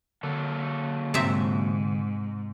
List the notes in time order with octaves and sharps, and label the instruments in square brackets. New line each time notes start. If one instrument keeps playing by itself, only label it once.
[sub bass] D3 [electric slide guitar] F#3 A#3 A4
[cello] G#2 [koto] C3 C4 E5